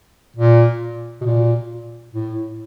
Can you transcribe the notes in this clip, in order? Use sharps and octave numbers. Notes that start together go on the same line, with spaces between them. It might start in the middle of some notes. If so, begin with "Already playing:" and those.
A#2
B2
A#2
A2